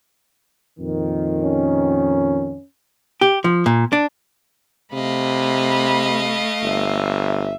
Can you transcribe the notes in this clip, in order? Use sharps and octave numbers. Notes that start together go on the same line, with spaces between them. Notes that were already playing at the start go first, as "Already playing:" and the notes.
F2 A#2 D#3
C#4
G4
F3
A#2
D4
C3 A3 D#5 F5 B5
G1 E5